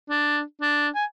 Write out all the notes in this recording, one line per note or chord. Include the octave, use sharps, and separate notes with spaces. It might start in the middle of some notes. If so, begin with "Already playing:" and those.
D4
D4
G#5